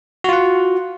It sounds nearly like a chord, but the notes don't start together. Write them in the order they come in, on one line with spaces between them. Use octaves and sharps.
F#4 F4 F#5